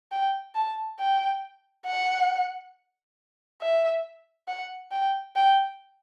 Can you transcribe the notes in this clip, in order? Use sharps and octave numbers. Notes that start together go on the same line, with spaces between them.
G5
A5
G5
F#5
E5
F#5
G5
G5